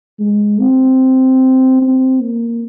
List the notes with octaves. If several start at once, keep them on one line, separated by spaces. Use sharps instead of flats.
G#3
C4
C4
A#3